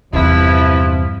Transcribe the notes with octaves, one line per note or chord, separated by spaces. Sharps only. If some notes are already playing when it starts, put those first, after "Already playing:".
E2 G2 C3 F3 E4 B4